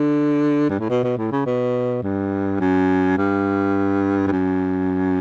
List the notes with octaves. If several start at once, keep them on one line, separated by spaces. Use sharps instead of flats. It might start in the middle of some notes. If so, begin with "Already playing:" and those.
Already playing: D3
G2
A2
B2
B2
A2
C#3
B2
G2
F#2
G2
G2
F#2